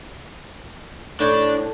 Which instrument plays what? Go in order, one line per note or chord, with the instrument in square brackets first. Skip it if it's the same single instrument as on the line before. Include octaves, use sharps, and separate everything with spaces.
[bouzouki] A2 [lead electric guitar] D4